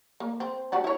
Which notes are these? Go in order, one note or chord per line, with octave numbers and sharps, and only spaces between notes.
A#3
C4
D4 F#4 G4
E4 C#5